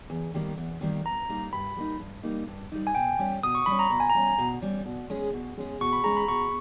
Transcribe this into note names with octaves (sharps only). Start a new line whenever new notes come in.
E2
D#3 G3 A#3
E2
D#3 G3 A#3
G2 A#5
G3 A#3 D#4
G2 B5
G3 A#3 D#4
G2
G3 A#3 D#4
G2
G3 A#3 D#4
G#5
B2 G5
G3 C#4
B2 D#6
C#6
G3 C#4 B5
A#5
B2 A#5
G#5
A#5
G3 C#4
B2
G3 C#4
B2
G#3 C#4 G#4
B2
G#3 C#4 G#4
B2 C#6
B5
G#3 C#4 G#4 A#5
B5
B2 C#6